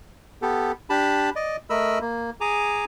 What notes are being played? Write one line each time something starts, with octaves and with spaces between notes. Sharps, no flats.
B3 G4 A4
D4 G4 A5 B5
D5 D#5
A3 A#4 D#5 B5 E6
A#3
G#4 G#5 A#5 D6